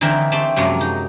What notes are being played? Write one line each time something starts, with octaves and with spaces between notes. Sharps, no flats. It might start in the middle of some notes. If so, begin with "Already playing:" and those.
D3 E3 C4 D#4 A#4 E5
A3 C4 G4 G5 A5
F#2 C3 F3 F#3 G#3 A#3
D#4